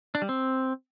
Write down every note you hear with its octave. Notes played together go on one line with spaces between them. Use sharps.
D4
G3
C4